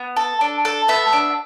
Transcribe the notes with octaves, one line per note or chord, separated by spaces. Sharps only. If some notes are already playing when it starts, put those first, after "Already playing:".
Already playing: B3
A4
D4
A4
B3 E5
D4